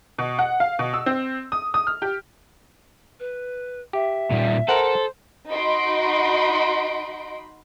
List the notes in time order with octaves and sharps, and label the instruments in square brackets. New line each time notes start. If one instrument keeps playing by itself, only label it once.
[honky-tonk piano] B2
F#5
F5
B2
E6
C4
D#6
D#6
F6
G4
[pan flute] B4
[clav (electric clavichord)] G4 [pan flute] E5
[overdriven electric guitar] A#2 G3
[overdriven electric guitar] A4 [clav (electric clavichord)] A#4 F#5 [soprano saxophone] C5
[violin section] D#4 F#4 D#5 B5 C6 D7